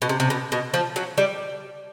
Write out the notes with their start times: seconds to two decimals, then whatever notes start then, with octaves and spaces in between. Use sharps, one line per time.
0.02 B2
0.09 C3
0.20 C3
0.30 B2
0.52 B2
0.74 F3
0.96 F#3
1.18 G3